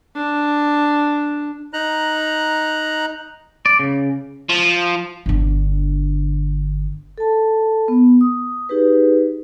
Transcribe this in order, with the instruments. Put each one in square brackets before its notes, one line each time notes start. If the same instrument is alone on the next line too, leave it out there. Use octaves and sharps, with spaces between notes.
[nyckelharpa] D4
[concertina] D#4 A#5 F#6
[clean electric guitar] D5
C#3
[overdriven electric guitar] F3
[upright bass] G1 D3
[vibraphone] A4 A5
B3
D#6
D#4 G4 G#4 B4